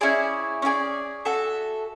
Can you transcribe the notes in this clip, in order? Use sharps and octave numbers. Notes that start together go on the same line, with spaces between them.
C#4 E4 G#4 D5
C#4 E4 G#4 D5
F#4 A4 E5